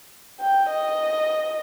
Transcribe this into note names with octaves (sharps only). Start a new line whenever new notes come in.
G5
D#5